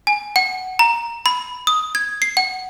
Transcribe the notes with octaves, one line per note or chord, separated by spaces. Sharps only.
G#5
F#5
A#5
B5
D#6
G#6
C7
F#5